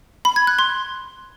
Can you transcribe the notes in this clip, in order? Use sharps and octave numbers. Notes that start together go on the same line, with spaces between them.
B5
G#6
F#6
C6